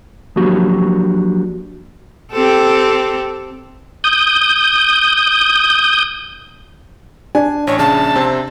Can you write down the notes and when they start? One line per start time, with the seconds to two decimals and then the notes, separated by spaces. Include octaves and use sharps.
0.36 F3 F#3 A#3 D4 F#4 G4
2.32 C4 G4 A4
4.04 D#6 G6
7.35 D4 G#5
7.67 A1 C#5
7.79 A#1 C#3 A5
8.15 C3 C4